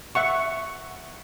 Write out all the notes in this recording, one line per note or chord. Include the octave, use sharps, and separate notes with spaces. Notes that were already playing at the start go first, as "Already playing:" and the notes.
E5 F#5 C#6